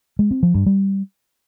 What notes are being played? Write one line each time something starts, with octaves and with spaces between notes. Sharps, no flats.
G#3
C4
F3
G2
G3